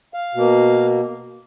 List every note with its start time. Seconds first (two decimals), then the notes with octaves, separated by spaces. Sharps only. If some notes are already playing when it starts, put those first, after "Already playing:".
0.14 F5
0.35 B2 A#3